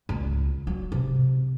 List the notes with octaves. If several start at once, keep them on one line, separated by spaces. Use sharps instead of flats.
C#2
F#3
C3